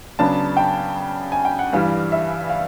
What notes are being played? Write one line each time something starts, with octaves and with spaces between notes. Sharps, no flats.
C#3 F#3 B3 D4 A5
G5
G#5
G5
F#5
G2 E3 G3 F5
E5
F5